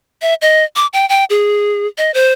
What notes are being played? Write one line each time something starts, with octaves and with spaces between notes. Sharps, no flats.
E5
D#5
D6
G5
G5
G#4
D#5
C5